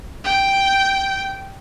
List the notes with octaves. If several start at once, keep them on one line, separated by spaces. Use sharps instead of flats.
G5 G6